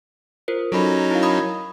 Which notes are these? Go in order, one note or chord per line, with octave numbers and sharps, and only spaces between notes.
F4 A#4 C5
F#3 C#4 D#4 A4 B5
E4 A#4 F5
B5 D#6 G#6